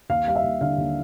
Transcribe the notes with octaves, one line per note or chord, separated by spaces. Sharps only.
D#2 F5
G3 F5
E5
D#2
D3 F5
D#2